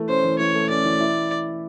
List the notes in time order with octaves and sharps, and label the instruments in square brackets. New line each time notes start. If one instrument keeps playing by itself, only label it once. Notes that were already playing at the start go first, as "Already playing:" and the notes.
Already playing: [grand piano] E3 A3
[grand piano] C#4 [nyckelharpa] C5
[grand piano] E3
[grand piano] E3 [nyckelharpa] C#5
[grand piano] A3
[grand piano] C#4 [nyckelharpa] D5
[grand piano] E3
E4